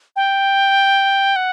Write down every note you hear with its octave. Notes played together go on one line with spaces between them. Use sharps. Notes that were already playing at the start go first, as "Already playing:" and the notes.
G5
F#5